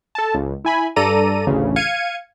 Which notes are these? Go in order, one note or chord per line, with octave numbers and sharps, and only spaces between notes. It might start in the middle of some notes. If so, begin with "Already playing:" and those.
A4 A5
C#2
E4 G#5 B5
G2 A4 D5 A#5 D#7
A1 D2 C#3
F5 G#6 C#7 D#7